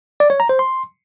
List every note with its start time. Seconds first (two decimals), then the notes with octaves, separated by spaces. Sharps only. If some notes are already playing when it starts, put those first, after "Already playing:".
0.20 D5
0.30 C#5
0.40 A#5
0.49 C5
0.59 C6